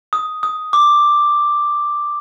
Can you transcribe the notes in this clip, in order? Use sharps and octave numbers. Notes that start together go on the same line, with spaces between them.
D#6
D#6
D6